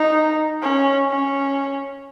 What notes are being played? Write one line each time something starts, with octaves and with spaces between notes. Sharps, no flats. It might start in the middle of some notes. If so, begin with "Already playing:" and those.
Already playing: D#4
C#4
C#4